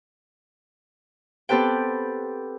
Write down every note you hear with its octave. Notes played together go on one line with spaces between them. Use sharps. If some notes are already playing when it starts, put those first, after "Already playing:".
B3 C4 G4 A4 B4 G5